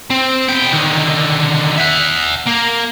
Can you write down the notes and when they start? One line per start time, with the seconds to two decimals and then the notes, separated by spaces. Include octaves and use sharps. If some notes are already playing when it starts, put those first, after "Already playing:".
0.10 C4
0.48 B3 G5
0.73 D3 D#3
1.78 E5 F#5
2.47 A#3